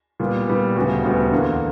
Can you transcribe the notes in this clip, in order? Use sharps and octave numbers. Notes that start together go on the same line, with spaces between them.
A#2 G3 B3
A#2 G3 B3
D2 C#3 G3 B3 F#4
D2 C#3 G3 B3 F#4
E2 D3 A#3